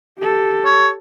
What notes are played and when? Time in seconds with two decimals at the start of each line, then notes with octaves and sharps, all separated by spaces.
0.19 G4 A4
0.65 C#5